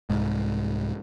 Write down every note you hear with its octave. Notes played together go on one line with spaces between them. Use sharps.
C2 G#2